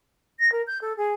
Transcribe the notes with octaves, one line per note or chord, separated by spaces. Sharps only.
A#6
A#4
G6
A4
G#4